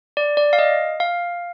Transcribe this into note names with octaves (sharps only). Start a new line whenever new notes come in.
D5
D5
F5
D#5
F5